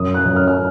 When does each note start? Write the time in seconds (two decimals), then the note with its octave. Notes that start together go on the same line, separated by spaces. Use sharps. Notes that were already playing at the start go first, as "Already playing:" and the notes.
Already playing: F#2 D#6
0.14 F#6
0.25 F#2
0.36 F6
0.48 F6